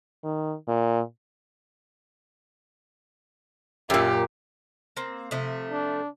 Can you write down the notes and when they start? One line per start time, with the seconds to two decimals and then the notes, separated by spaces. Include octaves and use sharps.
0.24 D#3
0.68 A#2
3.90 F#2 A#2 G4
4.97 A#3 C4
5.31 C3 F3 A3
5.72 D4